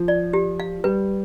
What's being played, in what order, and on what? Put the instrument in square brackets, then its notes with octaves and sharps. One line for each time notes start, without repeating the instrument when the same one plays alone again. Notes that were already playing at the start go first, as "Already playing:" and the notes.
Already playing: [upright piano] F3
[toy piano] D5
G4
F5
[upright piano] G3 [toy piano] B4